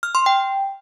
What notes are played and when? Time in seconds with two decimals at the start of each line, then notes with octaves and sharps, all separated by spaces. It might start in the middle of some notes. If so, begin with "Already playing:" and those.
0.03 F6
0.15 C6
0.26 G5